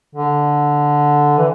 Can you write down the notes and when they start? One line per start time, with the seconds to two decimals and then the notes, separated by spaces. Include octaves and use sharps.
0.15 D3
1.38 E3